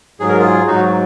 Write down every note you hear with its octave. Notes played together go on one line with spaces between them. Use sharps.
G#2 F#3 G#4
A#4
F4 G#4
G#2 F#3 D#4 F#4